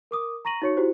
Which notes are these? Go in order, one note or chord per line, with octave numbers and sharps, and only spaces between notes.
A#4 D6 D#6
A#5 C#6 A#6 D#7 F#7
D#4 F#4 C#5 C#6 C#7
E4 F#4 G4 C5